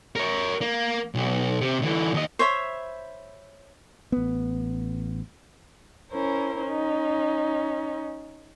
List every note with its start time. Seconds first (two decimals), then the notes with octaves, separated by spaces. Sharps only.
0.16 A#4 C#5
0.61 A#3
1.15 B1
1.61 C3
1.82 D3 E3
2.14 D#2 D#5
2.39 C5 C#5 E5 B5
4.12 A1 B3
6.11 C#4 E4 A#4 C5
6.62 C#4 D#4